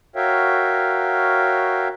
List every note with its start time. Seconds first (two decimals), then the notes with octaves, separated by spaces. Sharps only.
0.16 F#4 A#4 C#5 E5 F5 G5